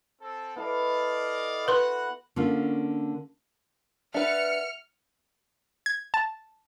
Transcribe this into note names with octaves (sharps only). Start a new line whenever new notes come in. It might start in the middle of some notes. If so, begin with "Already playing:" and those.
C4 A4
B3 E4 A4 D5 D#5 F5
F#4 B4 F#5 C6
D3 A#3 C#4 F4
D4 B4 E5 F#5 F6 C#7
G#6
A5